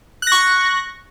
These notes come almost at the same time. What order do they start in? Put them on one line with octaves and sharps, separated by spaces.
F#6 A#6 C#6